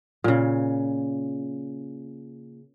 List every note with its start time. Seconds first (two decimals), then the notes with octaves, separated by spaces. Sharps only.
0.24 A#2 C#3